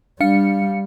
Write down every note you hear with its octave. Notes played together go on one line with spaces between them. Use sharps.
G3 D4 F5 C#7